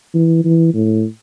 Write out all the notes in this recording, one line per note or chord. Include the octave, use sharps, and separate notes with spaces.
E3
E3
A2